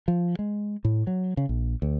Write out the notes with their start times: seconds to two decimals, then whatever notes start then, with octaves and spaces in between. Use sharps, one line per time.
0.08 F3
0.39 G#3
0.85 A2
1.07 F#3
1.37 C#3
1.49 A#1
1.82 D2